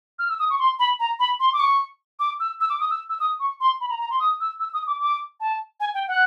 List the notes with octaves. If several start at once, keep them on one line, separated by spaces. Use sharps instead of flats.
F6
E6
D#6
C#6
C6
B5
A#5
B5
C6
D6
C#6
D6
E6
E6
D6
D#6
E6
E6
D#6
C#6
C6
B5
A#5
A#5
C6
D#6
E6
E6
D#6
D6
D6
A5
G#5
G5
F#5